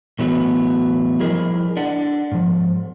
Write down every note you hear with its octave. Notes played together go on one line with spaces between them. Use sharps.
A2 E3 F#3 A3 B3 F#4
F3 G3 E4 G#4 A#4 D#5
D4 F#5
G#2 F3